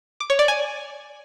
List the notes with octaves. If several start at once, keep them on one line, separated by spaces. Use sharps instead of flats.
D6
C#5
D5
G#5